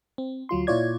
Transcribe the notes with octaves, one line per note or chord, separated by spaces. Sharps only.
C4
D2 F#3 F4 C6
A#2 E4 F4 C#5 D5 G#6